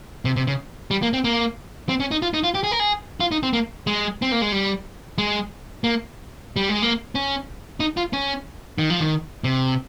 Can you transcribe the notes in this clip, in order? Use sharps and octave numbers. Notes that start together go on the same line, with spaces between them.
C3
C3
C#3
G3
A#3
C4
A#3
C4
C#4
D#4
F4
D#4
F4
G4
G#4
A#4
G#4
F4
D#4
C4
A#3
G#3
C4
A#3
G#3
G3
G#3
A#3
G3
G#3
A#3
C#4
D#4
F4
C#4
D#3
F3
D#3
C3